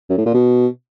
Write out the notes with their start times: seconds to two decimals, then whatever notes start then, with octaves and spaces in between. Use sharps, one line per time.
0.10 F#2
0.18 A2
0.26 A#2
0.34 B2